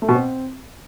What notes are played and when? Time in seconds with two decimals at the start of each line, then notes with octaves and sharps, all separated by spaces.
0.02 A3
0.08 B2
0.15 C4